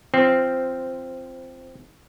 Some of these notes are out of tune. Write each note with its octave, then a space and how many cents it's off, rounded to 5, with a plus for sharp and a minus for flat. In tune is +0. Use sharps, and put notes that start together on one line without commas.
F3 -15 C4 +0